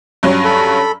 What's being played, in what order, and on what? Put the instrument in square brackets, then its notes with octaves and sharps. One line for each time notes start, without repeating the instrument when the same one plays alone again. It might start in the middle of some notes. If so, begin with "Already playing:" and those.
[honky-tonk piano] G2 F#3 C#4
[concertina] A4 B5